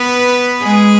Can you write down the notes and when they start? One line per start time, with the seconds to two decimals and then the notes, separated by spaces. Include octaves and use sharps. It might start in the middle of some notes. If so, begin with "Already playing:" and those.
Already playing: B3 B4
0.63 G#3 G#4